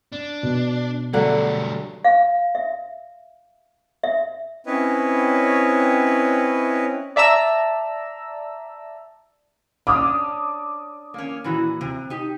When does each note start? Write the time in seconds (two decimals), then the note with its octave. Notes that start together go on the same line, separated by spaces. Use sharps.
0.12 D4
0.43 B2
1.13 D3 F#3 G3 A3 F#5
2.04 F5
2.55 E5
4.03 E5
4.66 C4 C#4 E4 B4 C#5 D#5
7.16 D5 E5 A5 A#5 E6
9.87 C#4 D4 D6 D#6
11.14 A#3 C#4
11.44 A#2 E3 F#4
11.81 C3
12.10 D#4 G4